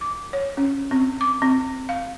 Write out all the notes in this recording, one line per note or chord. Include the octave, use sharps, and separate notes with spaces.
D6
C#5
C#4
C4
D6
C4
F5